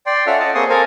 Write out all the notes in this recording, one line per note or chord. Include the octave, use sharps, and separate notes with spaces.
D5 G5 C6
C#4 F4 A4 E5 F#5 F6
F4 D#5 F#5 A5
A#3 C4 G#4 C6 C#6 D#6
A4 A#4 C5 F5 G#5 A#5